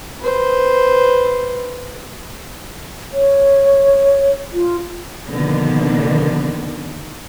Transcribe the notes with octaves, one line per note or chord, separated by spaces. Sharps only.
B4 C5
C#5
F4
B2 D3 D#3 F3 A#3 B3